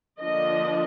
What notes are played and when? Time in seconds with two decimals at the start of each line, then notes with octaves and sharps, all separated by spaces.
0.21 D3 F3 A#3 D4 D#5